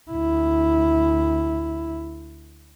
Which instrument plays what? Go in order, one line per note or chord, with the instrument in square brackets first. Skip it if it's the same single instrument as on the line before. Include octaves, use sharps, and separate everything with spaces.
[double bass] D2 E4